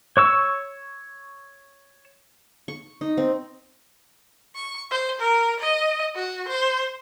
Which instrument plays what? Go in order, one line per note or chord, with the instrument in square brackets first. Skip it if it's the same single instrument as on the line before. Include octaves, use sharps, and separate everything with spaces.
[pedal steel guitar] C#5 C#6 E6
[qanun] C#6
D#4
C4
[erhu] C#6
C5
A#4
D#5
F#4
C5